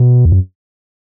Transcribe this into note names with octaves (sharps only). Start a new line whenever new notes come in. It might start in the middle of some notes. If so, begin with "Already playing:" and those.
Already playing: B2
E2
F#2